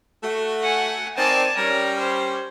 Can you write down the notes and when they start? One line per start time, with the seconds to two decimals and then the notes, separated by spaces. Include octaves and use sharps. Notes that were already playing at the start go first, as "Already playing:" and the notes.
0.23 A3 F#4
0.62 F#5 G#5
1.17 D#3 C4 D5 G#5 A5
1.57 G3 C#4 A#4
1.99 C5